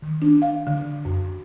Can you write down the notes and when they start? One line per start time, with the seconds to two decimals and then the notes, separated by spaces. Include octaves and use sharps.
0.02 D#3
0.22 D4
0.42 F5
0.67 D3
1.05 F#2